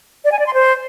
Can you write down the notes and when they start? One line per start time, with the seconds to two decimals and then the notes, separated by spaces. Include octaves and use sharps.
0.25 D5
0.32 G#5
0.39 D5
0.47 C6
0.54 C5